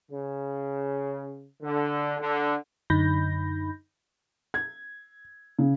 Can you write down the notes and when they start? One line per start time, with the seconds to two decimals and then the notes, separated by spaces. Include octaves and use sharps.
0.11 C#3
1.62 D3
2.19 D3
2.90 F#2 D3 D#4 B5 G6 A#6
4.54 G#6
5.59 C#3